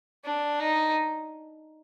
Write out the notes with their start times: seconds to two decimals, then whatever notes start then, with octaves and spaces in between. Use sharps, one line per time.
0.24 D4
0.60 D#4